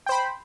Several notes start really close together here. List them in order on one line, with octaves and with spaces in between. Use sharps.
G5 C5 B5